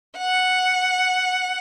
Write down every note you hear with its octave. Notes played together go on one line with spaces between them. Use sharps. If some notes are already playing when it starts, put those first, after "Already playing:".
F#5